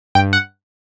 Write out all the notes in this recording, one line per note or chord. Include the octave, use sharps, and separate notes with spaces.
G2 G5
F#5